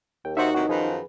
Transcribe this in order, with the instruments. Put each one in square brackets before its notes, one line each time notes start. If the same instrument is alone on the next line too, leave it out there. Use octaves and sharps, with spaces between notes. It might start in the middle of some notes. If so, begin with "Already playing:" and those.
[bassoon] D#2 [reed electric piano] G5
[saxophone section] D#3 F#4 [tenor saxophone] D#4 [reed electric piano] C5 E5
[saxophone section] C3 E3 [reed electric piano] F#4
[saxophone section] F#2 D#3 [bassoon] F3 [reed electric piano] G#4 B4